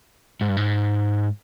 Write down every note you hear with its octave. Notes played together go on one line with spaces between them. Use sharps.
G#2
G2
G#2